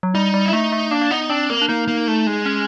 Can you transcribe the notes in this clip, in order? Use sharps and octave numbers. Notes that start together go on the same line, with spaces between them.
F#3
G3 D#4
G3
E4
A3 D#4
A3
A#3 D4
A#3
B3 D#4
C4 D4
A#3
D4
A#3 D#4
A#3
A3
G#3
C#4